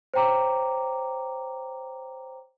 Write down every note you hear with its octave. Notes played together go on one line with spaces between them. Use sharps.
C5 C#5 G5 A#5 D6